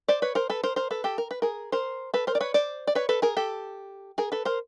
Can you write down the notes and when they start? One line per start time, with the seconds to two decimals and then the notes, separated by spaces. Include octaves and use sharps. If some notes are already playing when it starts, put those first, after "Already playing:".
0.08 C5 D5
0.22 B4 C#5
0.35 A#4 C5
0.50 A4 B4
0.64 A#4 C5
0.76 A#4 C5
0.91 A4 B4
1.04 G4 A4
1.18 A#4
1.31 B4
1.42 G#4 A#4
1.72 A#4 C5
2.14 A4 B4
2.27 A#4 C5
2.35 D5
2.40 B4 C#5
2.54 C5 D5
2.87 D5
2.95 B4 C#5
3.09 A4 B4
3.22 G#4 A#4
3.37 G4 A4
4.18 G#4 A#4
4.32 A4 B4
4.45 A#4 C5